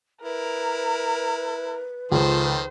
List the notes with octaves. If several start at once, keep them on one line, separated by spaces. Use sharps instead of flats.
E4 A#4 B4
C#2 D#3 F3 A4 C5